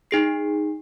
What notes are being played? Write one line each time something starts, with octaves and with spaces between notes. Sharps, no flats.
D#4 G#4 C7